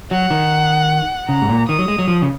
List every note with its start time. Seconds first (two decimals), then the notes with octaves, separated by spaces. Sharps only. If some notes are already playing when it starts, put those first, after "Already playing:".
0.11 F#3 F#5
0.31 D#3
1.29 C#3 A#5
1.42 G#2
1.49 A#2
1.69 D#3 D#6
1.79 F#3
1.88 G#3
1.99 F#3
2.08 F3
2.22 C#3